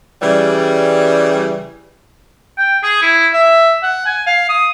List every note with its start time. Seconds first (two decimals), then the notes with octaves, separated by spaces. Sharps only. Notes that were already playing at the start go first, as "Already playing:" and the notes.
0.21 C#3 E3 G3
2.58 G5
2.83 G#4
3.02 E4
3.34 E5
3.83 F#5
4.06 G#5
4.27 F5
4.49 D#6